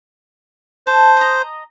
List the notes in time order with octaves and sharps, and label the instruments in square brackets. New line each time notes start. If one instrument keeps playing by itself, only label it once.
[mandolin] A4 [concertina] C5
[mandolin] D#5 A#5